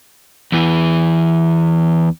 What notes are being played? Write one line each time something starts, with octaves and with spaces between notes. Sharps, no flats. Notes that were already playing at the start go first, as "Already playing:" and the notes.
E2 E3